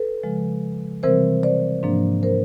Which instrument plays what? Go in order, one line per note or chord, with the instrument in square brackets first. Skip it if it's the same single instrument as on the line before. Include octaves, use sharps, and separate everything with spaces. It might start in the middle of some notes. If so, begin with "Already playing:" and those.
Already playing: [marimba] A4 B4
C#3 F3 G#3
C3 E3 G3 C4 A#4 C5
C5 D5
G#2 F3 A#3 D4
A#4 C5